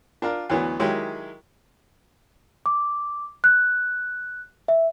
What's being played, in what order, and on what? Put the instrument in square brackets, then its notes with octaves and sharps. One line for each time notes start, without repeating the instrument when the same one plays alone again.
[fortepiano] D4 F4 A#4
D2 E3 F#3 B3
D#3 F#3 G#3 E4 G4
[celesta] D6
F#6
E5